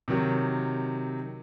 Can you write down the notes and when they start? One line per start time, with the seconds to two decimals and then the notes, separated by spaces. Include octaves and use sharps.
0.08 C3 D#3 F#3